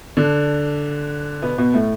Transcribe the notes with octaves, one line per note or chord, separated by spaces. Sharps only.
D3 D4
B2 B3
B2 B3
A2 A3